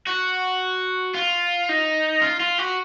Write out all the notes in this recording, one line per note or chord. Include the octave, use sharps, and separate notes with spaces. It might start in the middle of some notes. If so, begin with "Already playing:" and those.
F#4
F4
D#4
F4
F4
F#4